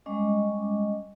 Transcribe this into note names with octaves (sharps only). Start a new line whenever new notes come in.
G3 G#3 C#4 D#5 D6